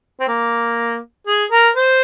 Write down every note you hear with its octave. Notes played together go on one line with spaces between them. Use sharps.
C4
A#3
G#4
A#4
C5